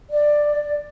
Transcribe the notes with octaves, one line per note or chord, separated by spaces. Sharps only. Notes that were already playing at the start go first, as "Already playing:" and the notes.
D5